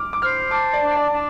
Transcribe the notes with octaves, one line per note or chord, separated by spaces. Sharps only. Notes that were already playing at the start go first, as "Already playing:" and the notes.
Already playing: D6 F6
D6
C5 F6
A5 D6
D5
D4
D5
D4